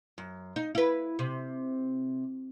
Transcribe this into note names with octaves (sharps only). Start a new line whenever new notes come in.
F#2
D#4
E4 B4
C3